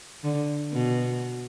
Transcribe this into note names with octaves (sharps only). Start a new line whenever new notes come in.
D3
B2